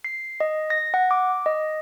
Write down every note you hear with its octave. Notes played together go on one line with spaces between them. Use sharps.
C7
D#5
A#6
F#5
D6
D#5